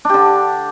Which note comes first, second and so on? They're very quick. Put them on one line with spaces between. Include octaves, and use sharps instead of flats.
D4 G4 D3